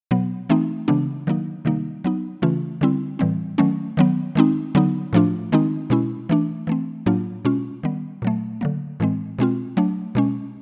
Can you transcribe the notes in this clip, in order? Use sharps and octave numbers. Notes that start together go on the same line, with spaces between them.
B2 F#3 B3
E3 A3 C4 D#4
C#3 E3 G#3 B3 D4
D#3 F#3 A#3 D#4
C3 D#3 G3 A#3 D#4
F#3 B3 D#4
C#3 E3 A3 C#4 F4
D3 G3 C4 E4
A2 E3 G3 C4
D#3 F#3 A3 C#4
D#3 F#3 B3
D#3 G#3 C4 D#4
D3 F#3 B3 D#4
A2 F3 A3 D4 F4
D#3 G#3 C4 D#4
B2 G#3 C#4 E4
E3 A3 D4
E3 A3 C4
A2 F#3 A#3 D4 F4
B2 G#3 C#4 F4
D#3 G3 B3
A#2 F#3 A3
D3 F#3 A#3
A2 E3 G#3 C4
B2 G#3 C4 F4
F#3 A3 D4
B2 G#3 C#4